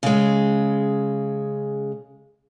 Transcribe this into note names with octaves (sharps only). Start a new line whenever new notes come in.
C#3 G#3